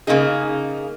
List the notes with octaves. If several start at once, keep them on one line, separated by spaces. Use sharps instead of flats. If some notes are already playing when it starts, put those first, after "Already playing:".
C#3 A#3 D#4 G#4